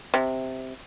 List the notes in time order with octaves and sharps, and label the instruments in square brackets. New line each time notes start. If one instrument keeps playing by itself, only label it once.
[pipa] C3